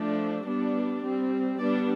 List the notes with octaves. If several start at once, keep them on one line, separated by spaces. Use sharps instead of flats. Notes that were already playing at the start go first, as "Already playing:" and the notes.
Already playing: F3 A3 D4
G3 B3 D4
G3 C4
G3 B3 D4 D5